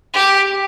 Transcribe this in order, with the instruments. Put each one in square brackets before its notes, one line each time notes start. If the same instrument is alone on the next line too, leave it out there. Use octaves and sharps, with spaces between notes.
[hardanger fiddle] G4